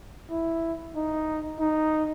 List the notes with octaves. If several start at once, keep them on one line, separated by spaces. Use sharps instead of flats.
E4
D#4
D#4